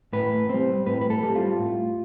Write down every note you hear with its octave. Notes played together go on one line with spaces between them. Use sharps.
A2 B4
G3 C4 C5
A2 B4
B4
A4
G3 C4
F4
A2